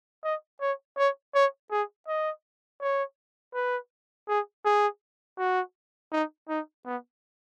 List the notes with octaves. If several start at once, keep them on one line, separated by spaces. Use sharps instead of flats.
D#5
C#5
C#5
C#5
G#4
D#5
C#5
B4
G#4
G#4
F#4
D#4
D#4
B3